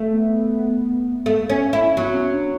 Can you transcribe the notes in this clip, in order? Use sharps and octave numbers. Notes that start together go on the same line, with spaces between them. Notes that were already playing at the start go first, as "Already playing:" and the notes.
Already playing: A3
B3
A3 B3
C#4
E4
F#3 B3
C#4
D4